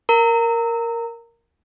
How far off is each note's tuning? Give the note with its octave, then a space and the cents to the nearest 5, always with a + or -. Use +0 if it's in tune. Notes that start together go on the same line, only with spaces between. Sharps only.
A#4 +0 A#5 -25